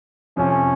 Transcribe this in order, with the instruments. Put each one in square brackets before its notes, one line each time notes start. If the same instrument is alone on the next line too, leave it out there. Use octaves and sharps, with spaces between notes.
[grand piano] F2 C3 F3 [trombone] C#4